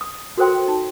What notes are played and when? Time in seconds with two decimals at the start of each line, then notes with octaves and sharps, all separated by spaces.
0.01 D#6
0.37 F#4 A4 A#4 C5 G5 C6
0.68 D#4